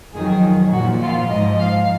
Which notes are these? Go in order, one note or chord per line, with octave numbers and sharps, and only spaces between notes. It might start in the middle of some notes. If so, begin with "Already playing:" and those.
F2 D#3 F#3 G#4
A#2 F3 F#4
F4
G#2 F3 D#5
F5